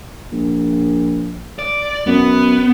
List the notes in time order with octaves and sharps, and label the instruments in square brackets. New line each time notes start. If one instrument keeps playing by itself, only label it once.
[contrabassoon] A#1
[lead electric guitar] D5
[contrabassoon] F#2 [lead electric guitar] B3